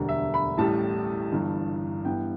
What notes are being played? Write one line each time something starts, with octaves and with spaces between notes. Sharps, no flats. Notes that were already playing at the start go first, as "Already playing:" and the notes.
Already playing: E1 D2 D3 G3
E5
B5
A1 A2 G3 A5
G1 G2 E3
G2 E3 B3 E4 G5